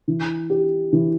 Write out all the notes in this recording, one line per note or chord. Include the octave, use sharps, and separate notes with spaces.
E3
G4
E3